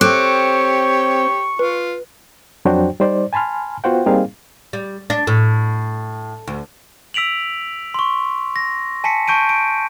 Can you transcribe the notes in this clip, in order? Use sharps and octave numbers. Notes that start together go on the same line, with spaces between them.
C4 G4 A4 C#5 C#6 D6 F#6
F4 B4
F2 F#3 D4 F#4 C5 G5
G3 D#4 C5 D5
G#5 A5 B5 C6 F6
B3 F4 F#4 C5 F#5 G5
G3 A#3 C4 D#4 G#4 F5
G3
D4
A2
D2
E6 B6 D7 F7 F#7
C6 C#6
A#6
G#5 A5 B6 C#7
A5 C#6 G6 D7 D#7
D7